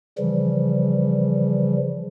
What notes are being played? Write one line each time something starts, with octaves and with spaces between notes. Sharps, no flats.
C#3 E3 F3 G3